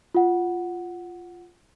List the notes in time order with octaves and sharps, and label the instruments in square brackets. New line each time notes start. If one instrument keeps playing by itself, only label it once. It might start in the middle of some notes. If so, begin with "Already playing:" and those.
[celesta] F4 F#5